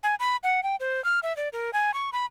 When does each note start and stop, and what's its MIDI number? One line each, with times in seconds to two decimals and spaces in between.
0.03 0.15 80
0.20 0.36 83
0.43 0.63 78
0.63 0.76 79
0.80 1.03 72
1.04 1.19 89
1.23 1.35 76
1.37 1.49 74
1.53 1.70 70
1.73 1.94 80
1.94 2.10 85
2.13 2.26 83